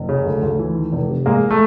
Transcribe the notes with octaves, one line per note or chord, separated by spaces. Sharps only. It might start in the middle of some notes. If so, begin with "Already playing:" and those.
Already playing: F#1
C#3
D2
D2
E3
D#3
F1
C3
A1 G#3 A#3
A3